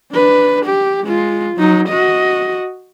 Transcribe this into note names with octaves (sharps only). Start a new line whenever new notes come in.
D4 B4
G4
G#3 F4
F#3 D#4
F#4 D#5